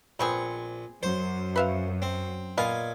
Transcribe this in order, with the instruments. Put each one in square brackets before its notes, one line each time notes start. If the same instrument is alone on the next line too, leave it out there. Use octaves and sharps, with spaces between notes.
[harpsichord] A#1 C#6 [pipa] B3 C4 G#4
[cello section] F#2 [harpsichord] C5
[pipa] B4 E5 F5
[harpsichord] C4
[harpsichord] A#2 G#5 [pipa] B3 D#5 F5